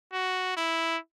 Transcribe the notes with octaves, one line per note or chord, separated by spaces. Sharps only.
F#4
E4